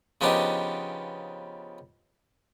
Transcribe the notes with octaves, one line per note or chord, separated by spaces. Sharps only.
C#3 F3 B3 D4 D#4 G4